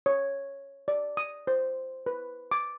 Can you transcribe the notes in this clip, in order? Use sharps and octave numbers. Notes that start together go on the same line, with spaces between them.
C#5
D5
D#6
C5
B4
D6